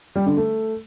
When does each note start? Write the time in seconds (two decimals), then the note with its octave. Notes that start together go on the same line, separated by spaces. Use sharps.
0.16 G3
0.26 D3
0.37 A3